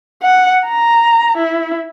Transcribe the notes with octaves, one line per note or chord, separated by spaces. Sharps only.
F#5
A#5
E4